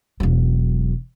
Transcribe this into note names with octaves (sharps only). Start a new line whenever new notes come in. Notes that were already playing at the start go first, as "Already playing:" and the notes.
E1 F#3